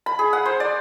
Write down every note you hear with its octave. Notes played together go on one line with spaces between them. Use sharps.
B5
G#4
F#5
C5
D5